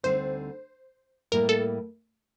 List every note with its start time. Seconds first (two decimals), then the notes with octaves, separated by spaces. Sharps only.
0.03 D2 D3 G3 C4 D#4 C5
1.32 A2 G3 A#3 A#4
1.49 A4